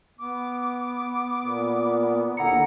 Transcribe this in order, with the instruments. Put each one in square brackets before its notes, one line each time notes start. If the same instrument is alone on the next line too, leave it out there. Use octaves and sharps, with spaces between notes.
[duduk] B3 [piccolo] D6
[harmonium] A#2
[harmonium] D#2 D3 A#5 [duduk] E4 [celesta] F#5 C#7